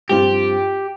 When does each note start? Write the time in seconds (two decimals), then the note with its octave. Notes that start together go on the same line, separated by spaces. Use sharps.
0.09 G2 F3 C4 F4 G4